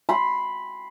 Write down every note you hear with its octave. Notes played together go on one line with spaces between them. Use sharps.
B5 C6